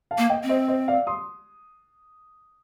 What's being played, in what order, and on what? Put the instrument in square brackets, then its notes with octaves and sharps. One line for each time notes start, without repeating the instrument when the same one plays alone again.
[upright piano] F5 A5
[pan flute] A#3
[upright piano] D#5 G5
[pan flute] C4
[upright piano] C5 D#5
C5 D#5
D5 F5
C6 D#6